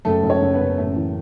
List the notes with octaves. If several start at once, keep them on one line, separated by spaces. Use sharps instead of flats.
F#1 A3 A4
F#1
C#4 C#5
F#1
B3 B4
F#1
A1 A3 A4
E3